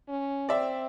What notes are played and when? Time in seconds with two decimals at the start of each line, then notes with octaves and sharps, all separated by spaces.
0.08 C#4
0.49 C4 D5 E5